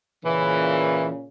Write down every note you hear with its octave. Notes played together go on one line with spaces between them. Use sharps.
A#2 C#3 E3